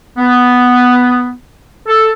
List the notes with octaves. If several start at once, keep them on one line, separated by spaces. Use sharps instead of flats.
B3
A4